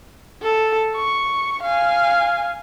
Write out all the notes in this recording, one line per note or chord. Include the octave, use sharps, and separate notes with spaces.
A4
C#6
F5 G#5